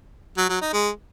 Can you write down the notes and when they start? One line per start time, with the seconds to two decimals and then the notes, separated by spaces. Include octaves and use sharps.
0.38 F#3
0.49 F#3
0.61 D#4
0.73 G#3